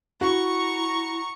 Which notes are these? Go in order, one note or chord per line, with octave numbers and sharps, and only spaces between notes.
E4 F#4 A#5 C#6